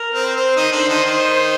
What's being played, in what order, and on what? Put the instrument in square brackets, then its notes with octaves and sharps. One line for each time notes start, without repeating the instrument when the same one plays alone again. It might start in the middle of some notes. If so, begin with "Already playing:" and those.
Already playing: [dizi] A#4
[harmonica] C4
[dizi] C5
[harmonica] C4
D#3 D#4
D3 D4
D#3 D#4
D#3 D#4